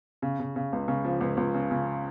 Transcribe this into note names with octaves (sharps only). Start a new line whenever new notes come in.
C#3
C#3
C#3
C#2
C#3
F3
C#2
C#2
C#3
C#3